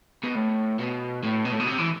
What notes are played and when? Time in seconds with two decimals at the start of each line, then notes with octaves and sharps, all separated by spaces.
0.24 B2
0.35 A2
0.79 B2
1.23 A2
1.45 B2
1.52 A2
1.60 B2
1.67 C3
1.78 E3